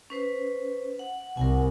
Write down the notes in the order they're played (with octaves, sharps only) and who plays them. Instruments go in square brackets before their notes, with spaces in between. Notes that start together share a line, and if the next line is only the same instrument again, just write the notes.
[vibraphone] C#4 B4 C5
F#5
[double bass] C2 [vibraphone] A#4 F#5 G#5